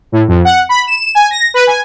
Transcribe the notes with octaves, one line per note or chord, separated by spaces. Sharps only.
A2
F2
F#5
B5
E7
G#5
A#6
B4
G#5